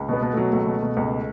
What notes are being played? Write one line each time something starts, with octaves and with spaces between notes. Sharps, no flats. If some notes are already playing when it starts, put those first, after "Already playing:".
Already playing: C#2
B2 B3
B2
F#3 A3
C#2 A3
B2
B2
C#2